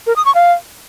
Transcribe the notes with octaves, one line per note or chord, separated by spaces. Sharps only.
A#4
D#6
C#6
F5